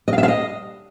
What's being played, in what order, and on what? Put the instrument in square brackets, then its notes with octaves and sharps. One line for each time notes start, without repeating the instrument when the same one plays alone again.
[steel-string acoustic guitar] D#5
F5
E5
F5
D#5